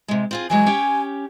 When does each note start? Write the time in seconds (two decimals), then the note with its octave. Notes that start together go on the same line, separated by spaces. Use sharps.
0.08 C3 G#3
0.31 C4 F4 G#4
0.50 E3 F#3 G#3 G#5
0.66 C#4 G4 G5